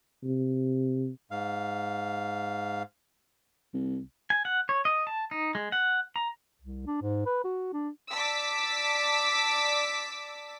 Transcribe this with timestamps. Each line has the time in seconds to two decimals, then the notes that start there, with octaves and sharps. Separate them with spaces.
0.24 C3
1.31 G#2 F5
3.74 C2
4.30 G#5
4.45 F#5
4.69 C#5
4.85 D#5
5.07 A5
5.31 D#4
5.55 G#3
5.72 F#5
6.16 A#5
6.62 C2
6.87 D4
7.02 G#2
7.26 B4
7.44 F#4
7.73 D4
8.12 D5 A5 D6 E6 B6